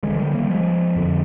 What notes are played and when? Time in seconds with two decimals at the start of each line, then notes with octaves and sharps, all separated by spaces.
0.03 D2 D3 F3 G#3
0.14 F3
0.19 D#3 G3
0.34 G3 A#3
0.49 F3 G#3
0.96 F2 D3